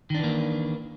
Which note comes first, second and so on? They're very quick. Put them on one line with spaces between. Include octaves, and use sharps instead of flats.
D#3 D4 E3 A#3